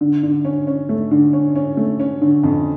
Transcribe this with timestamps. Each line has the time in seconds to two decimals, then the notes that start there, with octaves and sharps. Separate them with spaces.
0.01 D3
0.23 D3
0.45 C#4
0.67 C#4
0.89 A3
1.11 D3
1.33 C#4
1.55 C#4
1.77 A3
2.00 C#4
2.22 D3
2.43 F2